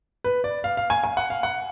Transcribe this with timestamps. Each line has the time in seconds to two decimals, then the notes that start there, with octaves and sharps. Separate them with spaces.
0.24 B4
0.44 D5
0.64 F5
0.77 F5
0.90 G#5
1.04 G#5
1.17 F#5
1.30 F5
1.43 F#5